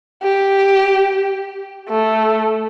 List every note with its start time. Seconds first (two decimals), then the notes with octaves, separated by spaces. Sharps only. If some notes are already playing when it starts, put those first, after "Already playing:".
0.23 G4
1.89 A3